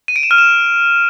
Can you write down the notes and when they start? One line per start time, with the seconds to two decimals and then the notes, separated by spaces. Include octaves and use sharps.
0.08 D#7
0.16 D7
0.23 E7
0.31 F6
0.38 E7